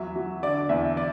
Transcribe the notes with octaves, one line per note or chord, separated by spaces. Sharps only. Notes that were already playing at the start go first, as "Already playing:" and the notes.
Already playing: E2 F#3 E5
F#3
D3 D5
E2 E5
D5